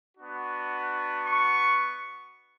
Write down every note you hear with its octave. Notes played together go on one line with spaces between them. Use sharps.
B3 D4 F#4
C#6